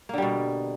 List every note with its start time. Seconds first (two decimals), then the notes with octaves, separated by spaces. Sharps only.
0.09 A#3
0.14 D3
0.18 G3
0.22 B2